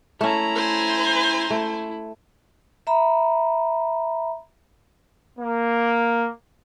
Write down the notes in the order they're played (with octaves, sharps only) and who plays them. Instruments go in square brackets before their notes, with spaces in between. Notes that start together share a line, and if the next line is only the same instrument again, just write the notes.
[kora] A3 C#4 [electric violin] E4 A#5
[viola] C5 G#5
[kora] A3 [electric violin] E4
[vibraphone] E5 A#5 B5
[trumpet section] A#3